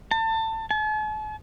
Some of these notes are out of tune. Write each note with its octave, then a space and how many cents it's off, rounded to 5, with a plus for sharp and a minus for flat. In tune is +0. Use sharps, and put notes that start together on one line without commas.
A5 +25
A5 -45